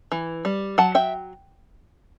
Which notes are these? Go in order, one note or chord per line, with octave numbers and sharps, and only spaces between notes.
E3
G3
F#3 F#5 A5
E5 G5